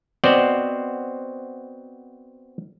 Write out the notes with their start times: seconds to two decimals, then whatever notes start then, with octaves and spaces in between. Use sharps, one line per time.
0.24 B3 C4 F#4 C5 D5 D#5